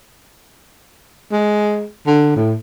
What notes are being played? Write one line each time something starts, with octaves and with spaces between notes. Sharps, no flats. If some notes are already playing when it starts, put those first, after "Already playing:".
G#3
D3
A2